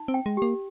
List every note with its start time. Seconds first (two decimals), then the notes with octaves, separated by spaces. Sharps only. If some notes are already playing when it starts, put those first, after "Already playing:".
Already playing: D#4
0.08 C4
0.14 G5
0.26 G#3
0.37 A#3 G4